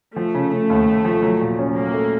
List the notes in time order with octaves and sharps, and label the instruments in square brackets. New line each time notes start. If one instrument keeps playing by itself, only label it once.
[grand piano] F3 [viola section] A3
[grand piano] C#3
C#3
D#2
D#2
F3
F#3
A#2
C#4
[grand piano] F#3 [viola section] A#3
[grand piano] A3